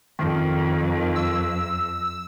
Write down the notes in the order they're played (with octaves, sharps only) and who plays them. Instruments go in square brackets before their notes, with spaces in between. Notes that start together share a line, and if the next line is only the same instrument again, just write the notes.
[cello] F2 [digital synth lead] D#3
[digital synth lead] E6